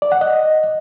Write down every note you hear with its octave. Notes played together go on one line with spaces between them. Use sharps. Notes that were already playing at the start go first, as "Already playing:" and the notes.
D5
F#5
D#5